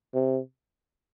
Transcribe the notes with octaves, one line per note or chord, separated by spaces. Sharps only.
C3